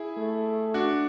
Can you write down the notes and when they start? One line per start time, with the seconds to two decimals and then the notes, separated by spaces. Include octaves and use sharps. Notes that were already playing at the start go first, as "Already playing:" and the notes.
Already playing: E4 G#4
0.17 A3
0.74 D4 F#4